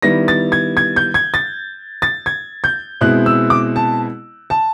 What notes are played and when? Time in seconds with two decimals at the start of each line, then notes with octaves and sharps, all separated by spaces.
0.02 D#3 G3 B3 E4 A#6
0.28 A6
0.52 G#6
0.77 G#6
0.96 G6
1.14 G#6
1.34 A6
2.02 A6
2.26 G#6
2.64 G6
3.01 B2 G#3 C4 E4 F#6
3.26 E6
3.50 D6
3.76 A5
4.50 A5